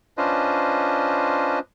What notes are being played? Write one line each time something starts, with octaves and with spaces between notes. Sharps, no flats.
C#4 D4 F4 B4 C5 D#5